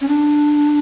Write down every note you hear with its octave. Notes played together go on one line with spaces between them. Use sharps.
C#4
D4